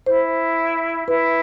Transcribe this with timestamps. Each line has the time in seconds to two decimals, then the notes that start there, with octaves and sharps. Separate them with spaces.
0.06 E4 C5
1.08 E4 B4